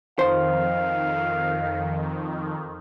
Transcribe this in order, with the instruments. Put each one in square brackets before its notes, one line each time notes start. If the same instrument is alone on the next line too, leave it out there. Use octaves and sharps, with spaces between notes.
[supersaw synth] F2 D#3 [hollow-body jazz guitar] C5 [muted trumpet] F5